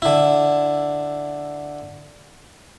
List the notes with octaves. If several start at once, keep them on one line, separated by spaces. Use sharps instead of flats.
D3 E4